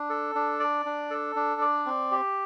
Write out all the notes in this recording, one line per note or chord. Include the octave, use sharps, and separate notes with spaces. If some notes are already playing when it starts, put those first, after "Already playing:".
Already playing: D4
A4
D4
D5
D4
A4
D4
D5
C4
G4